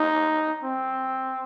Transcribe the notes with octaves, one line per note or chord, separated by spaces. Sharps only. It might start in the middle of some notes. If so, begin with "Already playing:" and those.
Already playing: D#4
C4